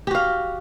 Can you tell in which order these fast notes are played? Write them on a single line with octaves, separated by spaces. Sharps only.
G4 F#4 F5